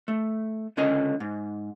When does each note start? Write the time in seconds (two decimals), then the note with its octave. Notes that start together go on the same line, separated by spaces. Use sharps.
0.08 A3
0.77 C#2 D3 C#4 A#4 D#5
1.20 G#2